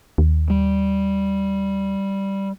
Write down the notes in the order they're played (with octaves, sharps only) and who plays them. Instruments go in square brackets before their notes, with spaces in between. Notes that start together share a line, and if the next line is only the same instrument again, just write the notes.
[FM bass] D#2
[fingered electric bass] G3